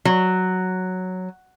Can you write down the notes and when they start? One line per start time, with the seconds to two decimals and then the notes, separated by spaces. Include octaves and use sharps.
0.05 F#3